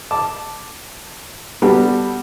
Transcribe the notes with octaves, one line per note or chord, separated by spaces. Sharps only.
A5 D6
G3 B3 D4 F#4 G4 A4